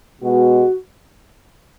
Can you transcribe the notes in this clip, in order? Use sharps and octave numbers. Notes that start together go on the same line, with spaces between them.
B2 G#3 F#4